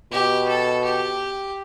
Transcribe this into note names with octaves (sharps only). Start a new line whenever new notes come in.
B2 G4
A4
G4